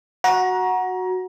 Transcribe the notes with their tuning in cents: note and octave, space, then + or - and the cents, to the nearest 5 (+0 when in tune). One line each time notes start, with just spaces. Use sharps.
F#4 -5 A#5 +25